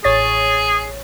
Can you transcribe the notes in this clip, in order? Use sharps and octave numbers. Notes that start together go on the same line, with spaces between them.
A1 G#4 C#5 A6